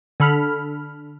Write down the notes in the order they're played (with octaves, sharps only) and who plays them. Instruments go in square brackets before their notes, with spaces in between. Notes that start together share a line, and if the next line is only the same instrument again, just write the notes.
[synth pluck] D3 A4 B5 F6